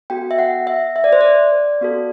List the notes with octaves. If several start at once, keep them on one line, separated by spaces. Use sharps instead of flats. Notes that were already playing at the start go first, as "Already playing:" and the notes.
B3 F#4 A4 G5
E5
F#5
E5
E5
D5
C5
D5
B3 F#4 A4